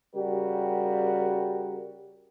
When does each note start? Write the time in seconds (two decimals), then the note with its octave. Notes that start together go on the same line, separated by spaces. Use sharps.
0.15 C#3 G3 F#4 G4 A#4